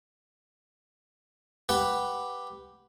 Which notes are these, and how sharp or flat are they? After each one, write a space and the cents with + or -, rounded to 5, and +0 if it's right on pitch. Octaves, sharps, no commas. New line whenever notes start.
G4 +0 B4 +0 F#5 +0